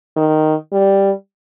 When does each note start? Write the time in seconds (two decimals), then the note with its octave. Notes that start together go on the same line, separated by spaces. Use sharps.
0.16 D#3
0.72 G3